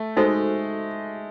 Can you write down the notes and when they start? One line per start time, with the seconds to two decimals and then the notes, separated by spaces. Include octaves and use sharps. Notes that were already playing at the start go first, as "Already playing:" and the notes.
Already playing: A3
0.17 G#3 D#4 F#4 A4 C5